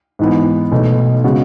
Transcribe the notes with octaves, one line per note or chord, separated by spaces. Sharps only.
G#2 E3 B3
B1 B2 A3
C#3 G#3 B3 F#4